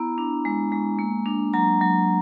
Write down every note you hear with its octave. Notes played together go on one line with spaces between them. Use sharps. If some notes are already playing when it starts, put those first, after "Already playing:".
Already playing: B3 E4 A#5
D4
G#3
G#3
A#3
D4
F#3 A#5
F#3